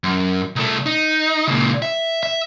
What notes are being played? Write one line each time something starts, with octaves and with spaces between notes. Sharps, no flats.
F#2
C2 A3
D#4
C#2 A#2
E5
E5